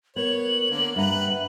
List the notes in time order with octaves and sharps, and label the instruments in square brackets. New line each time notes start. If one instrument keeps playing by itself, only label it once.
[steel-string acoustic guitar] B3 [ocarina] A#4 [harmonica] C#5 [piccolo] F#7
[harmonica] D3 A#3
[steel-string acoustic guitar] G2 A#5 [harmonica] B4 F#5 [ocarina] E5
[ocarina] E5